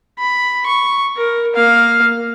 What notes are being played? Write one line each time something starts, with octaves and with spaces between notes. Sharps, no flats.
B5
C#6
A#4
A#3 F5